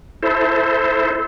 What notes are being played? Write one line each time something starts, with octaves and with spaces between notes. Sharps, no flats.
E4 A4 C5